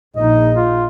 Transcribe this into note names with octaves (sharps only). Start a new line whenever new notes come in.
A#1 D#4 D#5
F4